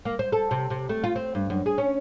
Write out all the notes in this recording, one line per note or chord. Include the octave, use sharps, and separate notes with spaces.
A#3
C5
A4
C3
C3
A3
F4
C4
G2
F#2
G#4
C#4